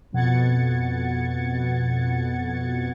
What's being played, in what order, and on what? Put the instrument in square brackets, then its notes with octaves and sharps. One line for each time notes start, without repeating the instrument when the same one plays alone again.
[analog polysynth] F2 B2 F#5 G#6 A6 C#7